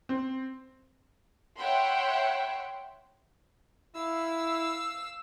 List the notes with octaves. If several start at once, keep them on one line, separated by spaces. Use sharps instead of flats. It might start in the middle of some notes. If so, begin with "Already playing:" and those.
C4
C#5 E5 F#5 G5 B5 C6
E4 F5 E6